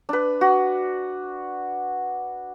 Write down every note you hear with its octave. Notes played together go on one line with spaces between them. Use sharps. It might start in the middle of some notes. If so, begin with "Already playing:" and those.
D4 B4
F#4